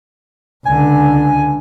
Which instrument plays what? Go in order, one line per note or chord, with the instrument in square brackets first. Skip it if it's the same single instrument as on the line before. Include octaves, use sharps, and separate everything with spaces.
[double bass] C#2 D3 [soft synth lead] G#5